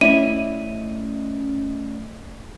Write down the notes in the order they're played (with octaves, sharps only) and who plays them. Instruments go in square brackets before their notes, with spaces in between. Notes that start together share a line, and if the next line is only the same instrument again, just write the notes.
[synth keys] A3 D#5 [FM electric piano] C#4 D5 [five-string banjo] E4 [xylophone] D#7